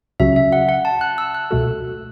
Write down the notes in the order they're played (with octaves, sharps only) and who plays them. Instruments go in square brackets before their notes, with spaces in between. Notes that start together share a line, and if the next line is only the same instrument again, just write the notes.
[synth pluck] C#2 C#3 F#3 C#4 F#4 [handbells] E5
[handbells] E5
F#5
F#5
A5
F#6
E6
F#6
[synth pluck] C#2 B2 A3 F#4 A4